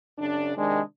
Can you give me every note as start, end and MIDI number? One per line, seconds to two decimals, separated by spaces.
0.18 0.54 42
0.18 0.54 49
0.18 0.54 62
0.57 0.80 48
0.57 0.80 51
0.57 0.81 56
0.57 0.80 62